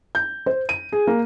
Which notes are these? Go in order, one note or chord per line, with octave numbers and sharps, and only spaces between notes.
G6
C5
D#7
G#4
A#3